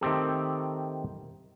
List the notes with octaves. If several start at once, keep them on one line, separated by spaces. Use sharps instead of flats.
D#3 A3 C4 G4 A4